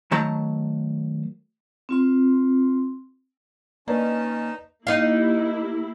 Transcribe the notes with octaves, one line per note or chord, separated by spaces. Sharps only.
D#3 F#3 A3 A5 A#5
C4 F4 C6
D#3 A#3 C#4 D#4 B4 D5 D#5 A5
A#3 D#4 E4 G4 F5